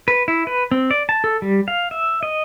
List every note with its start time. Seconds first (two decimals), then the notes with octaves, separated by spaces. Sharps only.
0.08 B4
0.28 E4
0.47 B4
0.71 C4
0.91 D5
1.09 A5
1.24 A4
1.42 G3
1.68 F5
1.91 E5
2.23 D#5